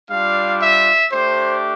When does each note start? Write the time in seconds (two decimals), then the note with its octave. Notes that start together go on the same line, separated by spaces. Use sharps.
0.10 G3 D4 F4 F5
0.60 E5
1.10 A3 D4 G4 C5